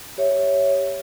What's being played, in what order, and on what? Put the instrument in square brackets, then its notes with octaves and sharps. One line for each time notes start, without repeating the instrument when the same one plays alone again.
[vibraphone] G4 C#5 E5